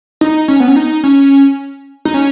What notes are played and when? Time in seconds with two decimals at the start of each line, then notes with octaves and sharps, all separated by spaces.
0.21 D#4
0.48 C#4
0.60 B3
0.68 C#4
0.76 D#4
1.04 C#4
2.05 D#4
2.14 C#4